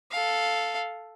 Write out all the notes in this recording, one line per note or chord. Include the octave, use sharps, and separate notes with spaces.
A4 F5